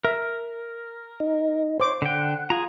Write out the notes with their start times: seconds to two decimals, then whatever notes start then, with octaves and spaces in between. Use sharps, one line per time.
0.05 A#4 E5
1.20 D#4
1.80 C5 C#5 D6
2.02 D3 F#5 G5
2.50 F4 G#4 A#5